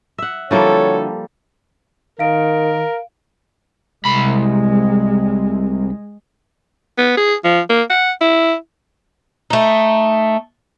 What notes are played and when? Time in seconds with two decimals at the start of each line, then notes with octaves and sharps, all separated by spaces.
0.18 E5 F#5
0.51 D3 F3 G3 A#3 E4 F#4 A4 C#5
2.19 D#3 A#4 F5 D7
4.06 C2 G#3 B5
6.98 B3
7.17 G#4
7.44 F3
7.69 A#3
7.90 F#5
8.21 E4
9.50 A3 D#4